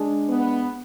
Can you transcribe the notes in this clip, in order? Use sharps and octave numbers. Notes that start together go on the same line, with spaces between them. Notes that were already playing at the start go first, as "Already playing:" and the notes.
Already playing: G#3 D4 G#4
B3